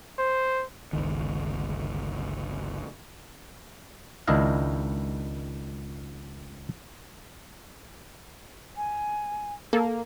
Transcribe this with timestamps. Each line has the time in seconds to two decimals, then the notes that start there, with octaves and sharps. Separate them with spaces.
0.18 C5
0.93 G1 C#2 D#3
4.28 C#2 D#3 D4 E4 D#5 F5
8.77 G#5
9.73 A#3 A4